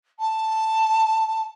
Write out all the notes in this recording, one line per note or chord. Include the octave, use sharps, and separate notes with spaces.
A5